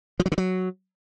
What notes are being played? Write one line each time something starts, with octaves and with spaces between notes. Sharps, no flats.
F3
F#3
D3
F#3